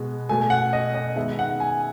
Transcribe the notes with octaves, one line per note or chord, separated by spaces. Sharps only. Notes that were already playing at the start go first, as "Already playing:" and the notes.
Already playing: B2 G#3 B3
B2 A3 G#5
F#5
D#5
D#5
D#3 G#3 B3 E5
F#5
G#5